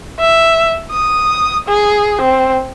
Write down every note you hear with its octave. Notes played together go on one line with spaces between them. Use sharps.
E5
D#6
G#4
C4